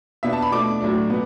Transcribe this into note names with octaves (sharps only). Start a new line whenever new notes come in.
B2 B3 D4 E5
A5
B5
B2 A3 D4 D6
A2 F#3 A3 D4
B2 B3